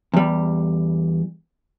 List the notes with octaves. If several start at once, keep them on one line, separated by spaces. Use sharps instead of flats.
E2 G3